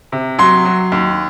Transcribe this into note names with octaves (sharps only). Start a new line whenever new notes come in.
C3
F#3 C6
F#3
D#2